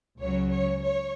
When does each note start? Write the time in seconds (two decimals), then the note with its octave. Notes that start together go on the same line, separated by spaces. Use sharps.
0.19 C#2 C#3 F#3 C#5
0.50 C#5
0.83 C#5